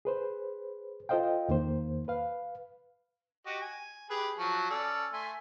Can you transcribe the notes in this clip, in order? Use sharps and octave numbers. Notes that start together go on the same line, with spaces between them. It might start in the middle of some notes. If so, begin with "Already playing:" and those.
G#4 B4 C5
F4 A4 C5 D#5 F5 G5
E2 D#3 A#3 C5
B4 F5
F#4 G4 D#5
G#5
G4 G#4 B4
F3 F#3 C#6
C#4 A4 D5
A3 G#5 C6